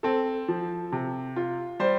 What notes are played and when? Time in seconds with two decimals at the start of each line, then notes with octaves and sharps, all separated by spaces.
0.03 C4 A4
0.48 F3
0.92 C3
1.36 F4
1.80 G3 C5